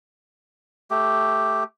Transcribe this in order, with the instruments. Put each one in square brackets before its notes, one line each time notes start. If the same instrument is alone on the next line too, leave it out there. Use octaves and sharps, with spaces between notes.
[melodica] A3 G4